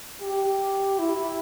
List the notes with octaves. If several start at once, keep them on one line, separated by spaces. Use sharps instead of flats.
G4
E4